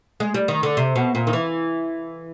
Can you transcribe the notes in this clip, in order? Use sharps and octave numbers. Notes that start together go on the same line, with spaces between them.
G#3
G3
D#3
D3
C3
B2
A#2
D#3
E3